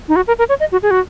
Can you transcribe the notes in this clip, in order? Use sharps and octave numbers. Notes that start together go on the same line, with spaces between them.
D#4
F#4
A#4
A#4
C#5
D#5
F#4
G#4
F#4